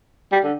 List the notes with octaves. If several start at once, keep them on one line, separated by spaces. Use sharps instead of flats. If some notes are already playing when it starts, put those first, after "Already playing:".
G3
D3